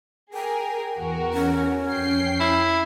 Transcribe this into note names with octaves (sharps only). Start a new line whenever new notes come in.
G#4 A#4 G5
E2 F#4 A#4
C#4
F2 G5 C7
E4